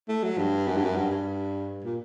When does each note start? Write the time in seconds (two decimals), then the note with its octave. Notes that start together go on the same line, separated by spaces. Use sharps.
0.08 A3
0.23 F#3
0.38 G2
0.68 F#2
0.77 G2
0.85 F#2
0.97 G2
1.11 G2
1.84 A#2